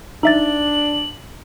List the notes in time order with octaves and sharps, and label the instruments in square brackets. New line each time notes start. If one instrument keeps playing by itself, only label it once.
[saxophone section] D4 [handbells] D#4 E5 A6 [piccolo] F#7